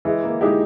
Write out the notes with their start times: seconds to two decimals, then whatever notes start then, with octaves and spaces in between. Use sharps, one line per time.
0.05 E3 G#3
0.23 A#3
0.41 G#3 D#4 E4 G4